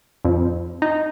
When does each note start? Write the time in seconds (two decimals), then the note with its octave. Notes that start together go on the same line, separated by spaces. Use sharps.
0.25 F2
0.82 D#4